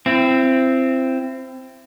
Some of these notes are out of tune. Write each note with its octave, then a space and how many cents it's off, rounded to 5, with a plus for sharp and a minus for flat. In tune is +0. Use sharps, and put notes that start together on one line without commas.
C4 +0 E4 +35